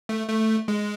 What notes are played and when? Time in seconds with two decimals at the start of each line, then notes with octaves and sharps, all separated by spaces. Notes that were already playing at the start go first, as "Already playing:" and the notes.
0.09 A3
0.29 A3
0.68 G#3